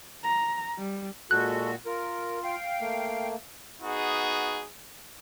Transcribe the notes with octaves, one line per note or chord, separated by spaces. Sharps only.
A#5
G3
A#2 G#3 F#4 A4 F#6
F4 A#4
F5 G5
A3 A#3
B3 D#4 F#4 G#4